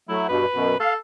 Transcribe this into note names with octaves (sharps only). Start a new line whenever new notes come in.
F#3 A3 E4
G2 B2 B4
F#2 B2
A4 F5